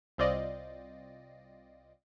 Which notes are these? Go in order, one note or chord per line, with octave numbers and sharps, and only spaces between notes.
C2 C4 F4 D5 D#5